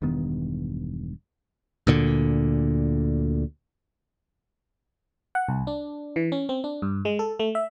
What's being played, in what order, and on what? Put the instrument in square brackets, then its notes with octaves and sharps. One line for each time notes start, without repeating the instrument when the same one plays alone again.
[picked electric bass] E1 G2 D#3 B3
D2 A#2 D3
[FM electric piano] F#5
C2
D4
E3
C#4
C4
D4
G2
G#3
A4
A3
E5